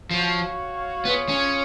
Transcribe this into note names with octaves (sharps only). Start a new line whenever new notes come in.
F3 F#4 C#5 F5
B3 F4 G#4 C#5
C#4